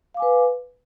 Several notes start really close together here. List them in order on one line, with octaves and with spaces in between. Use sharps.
F5 D6 G#5 B4